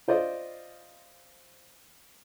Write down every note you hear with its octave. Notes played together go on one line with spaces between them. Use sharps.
F4 C5 D5 D#5